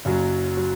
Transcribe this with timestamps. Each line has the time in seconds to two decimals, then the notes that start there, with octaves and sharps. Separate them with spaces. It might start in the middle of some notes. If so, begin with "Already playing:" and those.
0.05 F#1 F#2 F#3
0.57 F#3